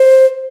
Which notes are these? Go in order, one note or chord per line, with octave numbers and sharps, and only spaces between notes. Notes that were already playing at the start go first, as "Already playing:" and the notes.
Already playing: C5